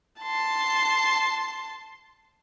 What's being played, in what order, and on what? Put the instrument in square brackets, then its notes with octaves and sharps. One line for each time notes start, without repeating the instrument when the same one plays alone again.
[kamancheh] A5 C6